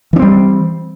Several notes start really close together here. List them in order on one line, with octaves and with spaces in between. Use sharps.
E3 D4 C4 G3